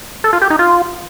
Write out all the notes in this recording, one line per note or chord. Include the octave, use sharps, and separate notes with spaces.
A4
F4
G4
D#4
F4